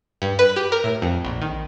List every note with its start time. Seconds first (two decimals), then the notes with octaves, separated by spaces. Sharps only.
0.22 G2
0.39 B4
0.56 G4
0.72 A#4
0.84 A2
1.02 F2
1.25 A#1
1.42 D#3